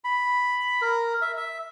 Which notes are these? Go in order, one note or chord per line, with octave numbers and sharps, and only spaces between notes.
B5
A#4
E5
E5